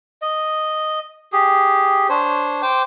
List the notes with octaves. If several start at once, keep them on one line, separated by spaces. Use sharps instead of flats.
D#5
G4 G#4
D4 C5 C#5
C5 G5 D6